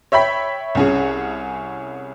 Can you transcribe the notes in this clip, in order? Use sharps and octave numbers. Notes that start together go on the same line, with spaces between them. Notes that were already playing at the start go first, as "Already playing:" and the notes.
C#5 E5 G5 B5 B6
C2 C#4 G#4